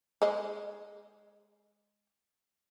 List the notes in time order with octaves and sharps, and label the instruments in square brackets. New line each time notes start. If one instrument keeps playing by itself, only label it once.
[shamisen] G#3 D#5